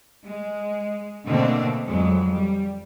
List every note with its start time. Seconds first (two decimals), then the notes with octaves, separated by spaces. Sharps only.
0.24 G#3
1.27 B2 D3 A3 A#3 C4 D4
1.86 F2 F#3 G#3
2.33 G3